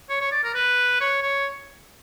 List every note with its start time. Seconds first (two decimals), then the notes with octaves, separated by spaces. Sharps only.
0.10 C#5
0.21 C#5
0.32 D5
0.44 A#4
0.55 B4
1.01 C#5
1.23 C#5